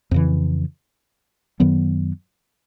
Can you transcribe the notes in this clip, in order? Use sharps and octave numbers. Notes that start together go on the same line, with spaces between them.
F2 C#3 E3
F#2 D#3 F#3 B3